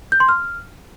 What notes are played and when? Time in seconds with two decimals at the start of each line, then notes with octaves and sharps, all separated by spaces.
0.12 G6
0.20 C6
0.29 F6